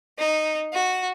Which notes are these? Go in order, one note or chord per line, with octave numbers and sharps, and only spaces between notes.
D#4
F#4